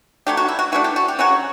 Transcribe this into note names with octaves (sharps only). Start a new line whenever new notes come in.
F#3 A3 D4 G4
F#4
E4
F#4
E3 A3 D4 F#4
G4
F#4
G4
C#3 F#3 C#4 F#4